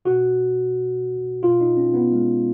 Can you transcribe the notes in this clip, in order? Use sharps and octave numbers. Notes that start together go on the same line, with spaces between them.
B2 F#4
B2 F4
D#4
C#4
B3
G#3